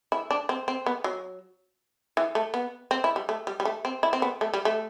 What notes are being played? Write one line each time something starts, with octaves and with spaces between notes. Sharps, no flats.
E4
D4
C4
C4
B3
F#3
E3
A3
B3
C4
E4
G3
A3
G3
G3
A3
C4
E4
C4
B3
A3
G3
A3